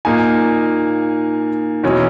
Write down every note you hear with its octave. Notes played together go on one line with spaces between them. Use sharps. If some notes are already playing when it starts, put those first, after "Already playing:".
A#2 A#3 D#4 G#5
E2 B2 F#3 C#4 E4